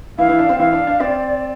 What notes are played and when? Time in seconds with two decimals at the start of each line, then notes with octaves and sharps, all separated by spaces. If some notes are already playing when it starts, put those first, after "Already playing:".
0.18 E3 E4 F5
0.28 E3 E4
0.39 D4
0.49 C4
0.59 E3 E4 F5
0.73 D4
0.87 D4
1.00 C4 D5